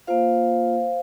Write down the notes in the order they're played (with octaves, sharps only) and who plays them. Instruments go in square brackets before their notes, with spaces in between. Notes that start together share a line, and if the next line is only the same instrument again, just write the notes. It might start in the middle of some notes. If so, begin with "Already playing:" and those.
[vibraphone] A#3 F4 C5 F5